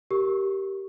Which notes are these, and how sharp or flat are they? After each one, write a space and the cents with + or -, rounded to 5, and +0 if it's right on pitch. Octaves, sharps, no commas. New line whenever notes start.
G4 -10 A#4 +0 C#6 +0